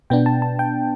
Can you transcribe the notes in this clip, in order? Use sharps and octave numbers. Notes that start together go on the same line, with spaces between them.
B2 B3 D4 G5
A5
A5
G5